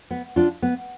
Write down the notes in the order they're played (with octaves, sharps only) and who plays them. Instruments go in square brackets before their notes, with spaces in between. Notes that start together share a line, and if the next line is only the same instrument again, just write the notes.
[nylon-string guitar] B3
D4 F4
B3